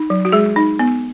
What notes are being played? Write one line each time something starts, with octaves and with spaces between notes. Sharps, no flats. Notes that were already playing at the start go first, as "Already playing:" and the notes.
Already playing: D#4
F#3
F#4
G#3 G#4
D#4
B3